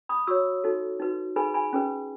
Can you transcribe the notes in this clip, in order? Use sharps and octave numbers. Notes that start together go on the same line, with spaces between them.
B5 D#6
F#4 C#5 C#6 E6
D#4 F#4 A4
D#4 F#4 B4
D#4 G#4 B4 G#5 B5
G#5 B5
C#4 G#4 B4